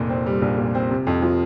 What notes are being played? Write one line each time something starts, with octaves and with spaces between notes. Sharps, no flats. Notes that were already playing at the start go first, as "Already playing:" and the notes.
Already playing: F1 A#2
C4
G3
A#1
A#2
C4
C3
F2
F3